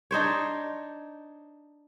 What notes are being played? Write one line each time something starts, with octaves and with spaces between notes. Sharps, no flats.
D4 D#4 C5 C#5